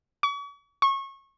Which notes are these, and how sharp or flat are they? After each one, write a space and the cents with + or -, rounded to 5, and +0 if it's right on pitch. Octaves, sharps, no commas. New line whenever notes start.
C#6 +40
C#6 -25